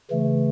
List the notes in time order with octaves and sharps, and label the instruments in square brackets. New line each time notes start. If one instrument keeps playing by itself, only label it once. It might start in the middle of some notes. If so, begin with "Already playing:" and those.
[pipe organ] C#3 E3 A3